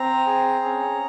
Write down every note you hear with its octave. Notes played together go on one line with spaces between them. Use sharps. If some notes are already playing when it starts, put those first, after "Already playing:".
Already playing: C4 A#5
G#4
C#4